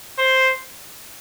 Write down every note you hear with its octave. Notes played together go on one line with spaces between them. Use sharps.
C5